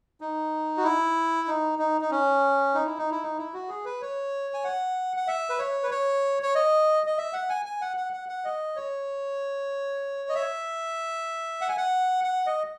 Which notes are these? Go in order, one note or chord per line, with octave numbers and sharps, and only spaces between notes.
D#4
F#4
E4
D#4
D#4
D#4
C#4
D#4
E4
D#4
E4
D#4
E4
F#4
G#4
B4
C#5
G#5
F#5
F#5
E5
B4
C#5
B4
C#5
C#5
D#5
D#5
E5
F#5
G#5
G#5
F#5
F#5
F#5
F#5
D#5
C#5
D#5
E5
F#5
G#5
F#5
F#5
D#5